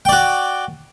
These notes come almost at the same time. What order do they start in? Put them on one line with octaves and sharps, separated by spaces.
G5 D5 F#4